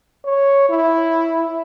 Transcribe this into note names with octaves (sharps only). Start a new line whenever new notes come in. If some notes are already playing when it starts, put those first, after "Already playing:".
C#5
E4